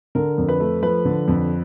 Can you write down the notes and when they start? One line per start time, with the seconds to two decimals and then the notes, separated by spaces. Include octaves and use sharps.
0.15 D3 A#4
0.38 F2
0.49 B4
0.60 A3
0.82 F3 B4
1.05 D3
1.28 F2